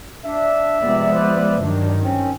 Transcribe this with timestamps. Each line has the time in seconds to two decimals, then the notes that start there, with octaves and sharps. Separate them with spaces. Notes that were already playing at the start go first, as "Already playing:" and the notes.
0.25 D4 E5
0.81 C3 F3 G#3 B3 D5
1.13 B4 C5 D5
1.61 G2 D#3 F#3 D4
2.02 C4 C#4